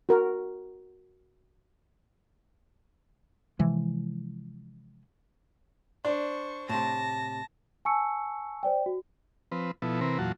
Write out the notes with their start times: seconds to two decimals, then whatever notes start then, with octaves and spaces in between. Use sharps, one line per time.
0.09 F#4 A#4
3.59 C3 E3 F3 G#3
6.05 D4 C5 C#6
6.69 A2 C3 A5 A#6
7.85 G#5 A5 C#6 E6 C#7
8.63 C5 D5 G5
8.86 F#4
9.52 F3 C4 B4
9.82 B2 F3 B3 E4 A4
10.01 C3 E3 C4 A#4 B4
10.19 E2 A#2 F#3 F4 F#4 A5